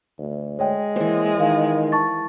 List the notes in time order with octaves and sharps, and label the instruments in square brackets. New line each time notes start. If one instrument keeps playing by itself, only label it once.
[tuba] D2
[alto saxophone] G#3 [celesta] C#5 D#5 G5
[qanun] E3 C5 [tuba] A#3
[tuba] D#3 [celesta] F5
[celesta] A5 C#6 A6